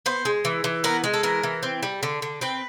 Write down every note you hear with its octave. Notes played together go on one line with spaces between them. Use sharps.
B3 C5
G#3
E3
E3
B3 A#4
G#3
A4
E3 A#4
E3
C4
G3
D3
D3
C4 B4